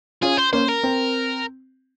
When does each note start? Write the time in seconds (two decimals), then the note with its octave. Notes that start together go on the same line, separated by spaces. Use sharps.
0.22 C#4 F4 G#4
0.38 C5
0.53 A#3 C#4 C5
0.68 A#4
0.83 C4